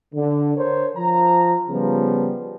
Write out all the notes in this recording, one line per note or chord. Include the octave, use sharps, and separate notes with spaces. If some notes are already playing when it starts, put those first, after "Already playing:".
D3
A#4 C5 C#5
F3 A#5
C#3 F3 G3 B3